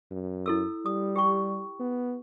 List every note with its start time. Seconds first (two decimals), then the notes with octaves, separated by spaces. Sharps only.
0.12 F#2
0.46 E4 A4 E6
0.86 G3 D#6
1.16 G4 G5 C#6
1.80 B3